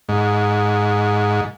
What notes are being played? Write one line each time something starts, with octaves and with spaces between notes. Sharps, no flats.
G#2